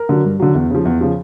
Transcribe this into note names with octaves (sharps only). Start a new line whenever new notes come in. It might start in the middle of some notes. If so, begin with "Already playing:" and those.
Already playing: A#4
D3 F#3
G2
D3 F#3
E2
C#3 F3
E2
C#3 F3